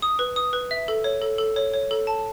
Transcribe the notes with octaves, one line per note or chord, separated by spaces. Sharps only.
D#6
B4
D#6
B4
E5
A4
C#5
A4
A4
C#5
C#5
A4
A5